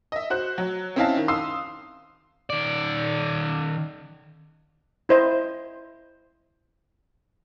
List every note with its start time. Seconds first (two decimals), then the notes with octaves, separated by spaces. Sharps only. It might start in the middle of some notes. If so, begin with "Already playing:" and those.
0.12 D#5 E5
0.30 F#4 C5 F#6
0.58 F#3
0.96 C4 C#4 E4 D#5 F5 A5
1.17 D#3
1.28 F5 C6 D#6 E6 C7
2.50 D#3 D5
5.09 E4 C5 D#5